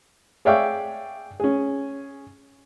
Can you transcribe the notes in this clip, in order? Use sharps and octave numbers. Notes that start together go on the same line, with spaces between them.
G#4 C#5 D5 E5 F5 G5
C#4 G#4